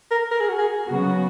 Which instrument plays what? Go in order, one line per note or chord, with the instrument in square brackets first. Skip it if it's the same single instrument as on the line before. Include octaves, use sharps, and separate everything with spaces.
[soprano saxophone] A#4
A#4
G#4
F#4
G#4
[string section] C#3 F#3 B3 F#4